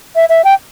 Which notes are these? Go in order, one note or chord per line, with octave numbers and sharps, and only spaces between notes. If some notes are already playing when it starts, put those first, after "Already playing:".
E5
E5
G5